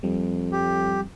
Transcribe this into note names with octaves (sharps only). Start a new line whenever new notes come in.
F2 G3
G4